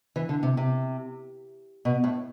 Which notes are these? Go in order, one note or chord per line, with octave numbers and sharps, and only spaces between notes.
E3
D3
C3
C3
B2
A2